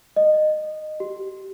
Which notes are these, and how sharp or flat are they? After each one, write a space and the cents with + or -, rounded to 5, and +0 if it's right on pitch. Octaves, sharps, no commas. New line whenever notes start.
D#5 -20
G4 -30